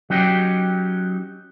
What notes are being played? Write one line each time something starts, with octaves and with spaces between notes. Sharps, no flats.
F#3 C#4 D#4 G4